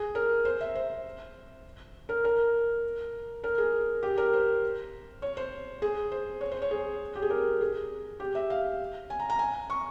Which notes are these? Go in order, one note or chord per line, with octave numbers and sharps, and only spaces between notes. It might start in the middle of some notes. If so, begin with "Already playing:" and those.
Already playing: G#4
A#4
C5
E5
C5
A#4
A#4
A#4
G#4
G4
A#4
C5
C#5
C5
G#4
C5
C#5
C5
C#5
G#4
G4
G#4
A#4
G#4
G4
E5
F5
G#5
A#5
A#5
G#5
C#6